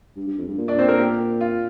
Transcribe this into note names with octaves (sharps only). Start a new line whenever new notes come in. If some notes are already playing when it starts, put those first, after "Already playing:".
G2
G2
F2
G2
A#2
D4 D5
C4 C5
A#3 A#4
G4
F4